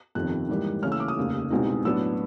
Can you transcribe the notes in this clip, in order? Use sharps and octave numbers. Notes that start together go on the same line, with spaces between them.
G1 F2 C3 D#3 F#6
G#2 E3 G3 A#3
D#2 C#3 E3 A3 C#4 F6
E6
D6
D#6
F1 D#2 C#3
C2 B2 G#3 C4 D#4
A2 F#3 B3 D4 E6